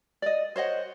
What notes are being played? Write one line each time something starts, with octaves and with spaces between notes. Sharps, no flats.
D5 D#5
C5 C#5 D#5 F#5